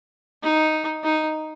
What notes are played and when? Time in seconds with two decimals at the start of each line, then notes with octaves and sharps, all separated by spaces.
0.43 D#4
1.04 D#4